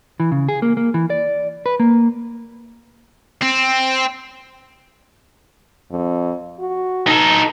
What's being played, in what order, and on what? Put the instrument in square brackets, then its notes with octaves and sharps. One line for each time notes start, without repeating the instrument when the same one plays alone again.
[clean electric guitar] E3
C#3
G#4
A#3
A#3
E3
D5
B4
A#3
[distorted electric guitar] C4
[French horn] F2
F#4
[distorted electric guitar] D#4 A4